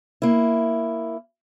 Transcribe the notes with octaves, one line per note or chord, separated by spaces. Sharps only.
A#3 E4